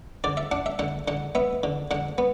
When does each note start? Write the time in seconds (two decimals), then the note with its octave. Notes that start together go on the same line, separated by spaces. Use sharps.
0.24 D3 D5
0.37 E5
0.51 D4 F#5
0.66 E5
0.79 D3 F#5
1.08 D3 F#5
1.35 B3 E5
1.63 D3
1.91 D3 F#5
2.18 B3